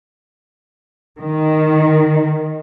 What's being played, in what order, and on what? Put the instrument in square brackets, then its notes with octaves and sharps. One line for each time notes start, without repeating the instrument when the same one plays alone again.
[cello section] D#3